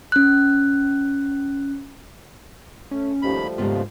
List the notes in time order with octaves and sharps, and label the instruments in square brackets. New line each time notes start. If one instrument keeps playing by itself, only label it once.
[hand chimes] C#4 F#6
[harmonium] A3 [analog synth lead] C#4
[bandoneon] D#2 B5 [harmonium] F3 G3 A3
[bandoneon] D#2 [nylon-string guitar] G#2 C#3 B3 [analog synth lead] F4